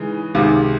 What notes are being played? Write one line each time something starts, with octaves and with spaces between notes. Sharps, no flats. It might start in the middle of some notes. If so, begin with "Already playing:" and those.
Already playing: C#3 E3 G#3 D#4
C#2 C3 D#3